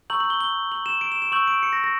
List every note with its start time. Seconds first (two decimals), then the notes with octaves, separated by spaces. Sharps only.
0.10 A#5 C#6 E6 G6 F#7
0.20 F#7
0.30 G7
0.41 G7
0.72 F#7
0.86 E7
1.01 D7
1.12 E7
1.22 E7
1.32 C#6 E6 G6 F#7
1.47 D7
1.63 C#7
1.73 A#6
1.84 A#6